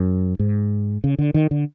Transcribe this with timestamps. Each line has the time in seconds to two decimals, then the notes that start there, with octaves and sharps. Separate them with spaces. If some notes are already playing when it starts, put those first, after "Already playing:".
Already playing: F#2
0.39 G#2
1.04 C#3
1.19 D3
1.34 D#3
1.51 D3